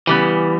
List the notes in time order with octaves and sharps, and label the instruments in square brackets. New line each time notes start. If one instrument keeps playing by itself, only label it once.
[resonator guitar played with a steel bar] C#3 G3 B3 [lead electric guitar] E3